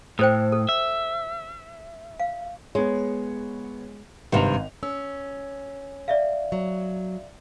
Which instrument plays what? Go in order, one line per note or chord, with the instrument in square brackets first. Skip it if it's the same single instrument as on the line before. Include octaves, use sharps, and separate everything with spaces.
[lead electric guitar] A2 [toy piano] A4 C5 G5
[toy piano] A4
[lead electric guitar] E5
[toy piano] F5
[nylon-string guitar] G#3 [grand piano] B3 C#5
[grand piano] G#1 F5 F7 [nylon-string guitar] G2 C3
[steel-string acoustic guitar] C#4 [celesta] E6
[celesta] D5 E5 F5
[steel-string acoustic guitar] F#3